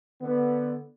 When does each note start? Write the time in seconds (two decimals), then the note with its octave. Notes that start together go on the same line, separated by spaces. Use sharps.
0.21 D3 B3